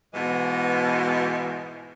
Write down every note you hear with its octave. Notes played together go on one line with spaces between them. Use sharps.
G#2 B2 E3 G#3